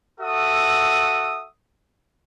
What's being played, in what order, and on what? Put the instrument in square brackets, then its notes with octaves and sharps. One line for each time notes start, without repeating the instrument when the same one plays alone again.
[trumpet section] F#4 A4 E5 F#5 D#6